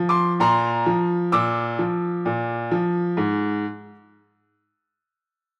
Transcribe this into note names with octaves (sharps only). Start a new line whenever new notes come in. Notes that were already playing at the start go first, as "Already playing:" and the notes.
Already playing: F3
C6 D6
A#2 A#5 C6
F3
A#2 D6 E6
F3
A#2
F3
G#2